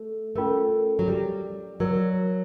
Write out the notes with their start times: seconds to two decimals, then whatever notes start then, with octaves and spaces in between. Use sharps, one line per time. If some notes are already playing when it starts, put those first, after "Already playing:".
Already playing: A3
0.36 A3 C#4 F4 A#4
0.99 F#3
1.08 G3
1.80 F#3 A#4 D5 F#5